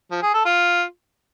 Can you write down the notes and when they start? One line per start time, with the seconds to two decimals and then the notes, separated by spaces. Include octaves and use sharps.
0.11 F3
0.22 G#4
0.34 A4
0.45 F4